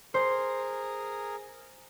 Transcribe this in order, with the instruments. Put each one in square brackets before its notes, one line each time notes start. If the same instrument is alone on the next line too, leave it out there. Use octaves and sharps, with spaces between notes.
[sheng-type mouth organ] G#4 A#4 [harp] C5